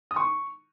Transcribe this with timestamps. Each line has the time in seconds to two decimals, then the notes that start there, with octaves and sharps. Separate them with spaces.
0.11 D#6
0.16 C#6